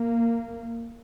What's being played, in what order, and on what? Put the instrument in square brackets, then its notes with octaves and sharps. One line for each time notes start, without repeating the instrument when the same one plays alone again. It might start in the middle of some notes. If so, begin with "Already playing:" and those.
Already playing: [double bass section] A#3